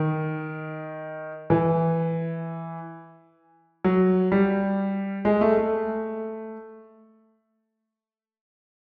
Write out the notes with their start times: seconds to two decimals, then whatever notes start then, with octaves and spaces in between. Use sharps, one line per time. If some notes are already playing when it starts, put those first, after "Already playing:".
Already playing: D#3
1.50 E3
3.84 F#3
4.32 G3
5.25 G#3
5.41 A3
5.57 A3